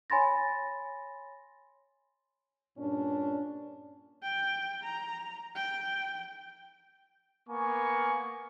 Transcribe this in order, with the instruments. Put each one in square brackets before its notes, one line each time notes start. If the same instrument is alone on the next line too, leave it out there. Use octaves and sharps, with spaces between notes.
[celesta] C#5 G#5 B5 C6 A6 A#6
[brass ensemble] G2 A#2 C#4 D4
[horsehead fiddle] G5
A#5
G5
[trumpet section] A#3 B3 G#5 C#6